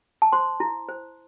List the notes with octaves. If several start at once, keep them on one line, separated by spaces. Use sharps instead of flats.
A5
C5 C6
E4
C5